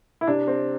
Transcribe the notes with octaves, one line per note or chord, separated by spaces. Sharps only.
E4
C3 D4
C4